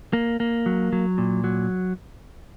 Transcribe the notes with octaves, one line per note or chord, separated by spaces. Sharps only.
A#3
A#3
F#3
F#3
A#2
F#3